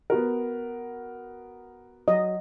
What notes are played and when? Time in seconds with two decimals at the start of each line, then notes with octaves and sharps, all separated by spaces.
0.10 B3 F#4 A#4
2.08 F#3 D#5